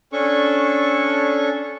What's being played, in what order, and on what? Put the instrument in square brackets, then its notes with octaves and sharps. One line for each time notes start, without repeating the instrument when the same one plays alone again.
[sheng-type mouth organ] C#4 D4 A4 C#6